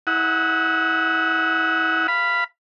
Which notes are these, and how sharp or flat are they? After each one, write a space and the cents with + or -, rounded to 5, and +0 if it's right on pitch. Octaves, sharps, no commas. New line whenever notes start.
E4 -25 F#5 +0 D#6 +45
F5 -15 B5 +0